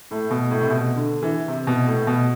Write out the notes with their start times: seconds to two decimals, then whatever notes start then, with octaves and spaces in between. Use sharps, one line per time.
0.11 A2
0.31 B2
0.51 A2
0.61 C3
0.70 B2
0.96 D3
1.22 E3
1.48 C3
1.67 B2
1.87 A2
2.07 B2